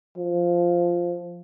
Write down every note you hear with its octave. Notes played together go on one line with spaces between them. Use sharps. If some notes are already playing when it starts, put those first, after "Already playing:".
F3